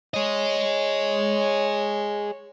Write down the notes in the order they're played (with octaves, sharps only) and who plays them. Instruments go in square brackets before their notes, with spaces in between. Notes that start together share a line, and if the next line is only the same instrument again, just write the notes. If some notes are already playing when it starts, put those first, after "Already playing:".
[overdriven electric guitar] G#4 D#5 [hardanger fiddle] C#5